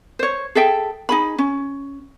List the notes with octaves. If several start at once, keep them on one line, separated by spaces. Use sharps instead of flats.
C5 C#5
G#4 A4 E5 G5
D#4 G#4 B5
C#4